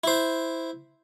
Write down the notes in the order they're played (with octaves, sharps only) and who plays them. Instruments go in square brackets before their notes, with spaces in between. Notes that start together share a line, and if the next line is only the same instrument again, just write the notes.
[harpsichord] E4 C5